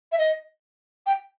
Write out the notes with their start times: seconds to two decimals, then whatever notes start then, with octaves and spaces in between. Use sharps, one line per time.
0.12 E5
0.19 D#5
1.06 G5